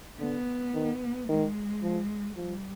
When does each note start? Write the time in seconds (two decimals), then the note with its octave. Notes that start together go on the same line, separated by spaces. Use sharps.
0.20 D3 B3
0.74 D#3
1.28 D#3 G#3
1.82 F3
2.37 F3 G3